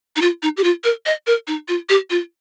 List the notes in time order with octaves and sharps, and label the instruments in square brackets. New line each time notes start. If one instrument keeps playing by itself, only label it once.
[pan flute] D#4
F4
D#4
G4
F4
A#4
D#5
A#4
D#4
F4
G4
F4